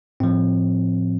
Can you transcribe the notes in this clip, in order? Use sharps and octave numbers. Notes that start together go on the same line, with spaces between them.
A2 F3 C4